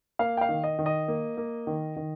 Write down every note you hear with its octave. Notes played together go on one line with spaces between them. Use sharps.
A#3 F5
G5
F5
D#3
D#5
D#3
D#5
A#3
A#3
D#3
D#3